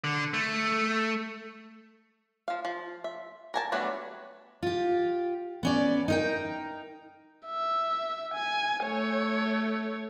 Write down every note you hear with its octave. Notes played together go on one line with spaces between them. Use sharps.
D3
A3
F3 F5
F3
E5
A#4 G#5 A5
F#3 G3 A3 B3 D4
F4 G4
B3 C#4 D5
D#4 A#4 G5
E5
G#5
A3 C#5